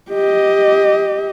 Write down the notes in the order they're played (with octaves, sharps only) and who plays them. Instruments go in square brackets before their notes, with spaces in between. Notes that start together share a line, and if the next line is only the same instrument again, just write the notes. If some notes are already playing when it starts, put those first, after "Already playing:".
[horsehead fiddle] G4 D#5